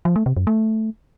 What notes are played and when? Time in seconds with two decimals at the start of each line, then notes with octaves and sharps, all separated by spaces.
0.05 F3
0.16 A3
0.26 C3
0.37 F#2
0.47 A3